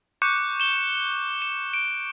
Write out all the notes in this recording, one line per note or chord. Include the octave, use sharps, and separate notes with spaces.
C#6 D6 F#6 G6 C#7
E7 G7
E7
D7